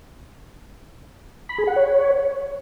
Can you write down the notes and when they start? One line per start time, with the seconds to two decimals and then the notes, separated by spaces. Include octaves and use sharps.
1.49 B5
1.58 G#4
1.67 F#5
1.76 C#5